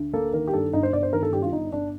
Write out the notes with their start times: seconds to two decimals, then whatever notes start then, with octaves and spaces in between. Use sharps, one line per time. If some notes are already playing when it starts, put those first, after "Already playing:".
Already playing: D2
0.13 A#3 A4
0.33 D#3 A#4
0.47 G4
0.53 G2 A4
0.73 G1 D#4
0.83 C5
0.93 G1 D5
1.03 C5
1.13 D#3 A#4
1.23 A4
1.32 G2 G4
1.42 F4
1.52 G1 D#4
1.72 G1 D4